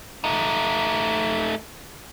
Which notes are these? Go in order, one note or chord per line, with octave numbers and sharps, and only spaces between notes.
A3 D#4